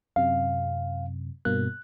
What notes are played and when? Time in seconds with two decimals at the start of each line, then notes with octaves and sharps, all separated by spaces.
0.16 F#2 C3 F5
1.45 G2 B2 A#3 F#6